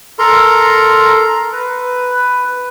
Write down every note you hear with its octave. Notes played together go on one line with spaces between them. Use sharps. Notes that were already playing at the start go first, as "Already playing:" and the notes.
A4 A#4 A#5 C6
A#5
B4